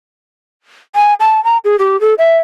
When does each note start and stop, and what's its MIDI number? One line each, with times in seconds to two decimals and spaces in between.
0.95 1.14 80
1.20 1.43 81
1.44 1.57 82
1.64 1.76 68
1.79 1.99 67
2.01 2.14 69
2.18 2.38 76